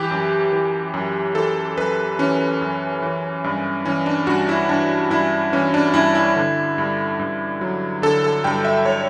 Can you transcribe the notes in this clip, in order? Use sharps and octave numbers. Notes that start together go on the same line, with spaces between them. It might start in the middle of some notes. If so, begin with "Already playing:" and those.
Already playing: E3 G4
F#2
E3
F#2
E3 A4
F#2 B4
E3 C#4
F#2
E3
G2
E3 C#4
D4
G2 F#4
E4
E3 D4
G2 E4
E3 C#4
D4
G2 E4
E4
D3
G2
G2
F#3
D3 A4
A4
G2 G5
E5
C#5